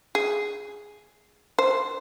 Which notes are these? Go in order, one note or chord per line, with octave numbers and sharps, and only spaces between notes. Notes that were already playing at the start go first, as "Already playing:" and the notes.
G#4
C5